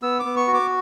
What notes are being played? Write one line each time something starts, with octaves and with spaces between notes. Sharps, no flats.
B3 E6
D6
B3
C#6
F#4
D6